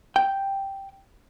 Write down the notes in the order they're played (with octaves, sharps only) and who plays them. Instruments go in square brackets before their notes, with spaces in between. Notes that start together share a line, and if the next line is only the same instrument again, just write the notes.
[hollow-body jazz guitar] G5